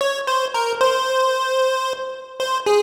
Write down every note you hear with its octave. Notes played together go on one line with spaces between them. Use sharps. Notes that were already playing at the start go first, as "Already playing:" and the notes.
C#5
C5
A#4
C5
C5
G#4